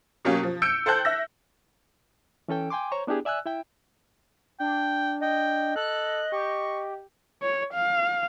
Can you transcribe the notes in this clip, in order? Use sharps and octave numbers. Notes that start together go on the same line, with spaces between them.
B2 F#3 A#3 C#4 G4
F3
E6 G6 C#7 D7
A4 C5 G5 A5 F#6 G6
E5 E6 A#6
E3 C#4 A4 G5
G5 G#5 C6 D6
C5 C#5 A#5 C#6
B3 D4 E4 G4 G#4
D5 E5 G#5 E6 F#6
E4 E5 G5
D4 G5
D#5 G5
A4 F#6
G4 C#6
C#5
F5